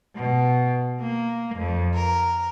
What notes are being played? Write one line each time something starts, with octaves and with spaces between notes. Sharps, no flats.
B2
A#3
F2
A#4